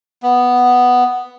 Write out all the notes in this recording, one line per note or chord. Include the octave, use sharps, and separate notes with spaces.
B3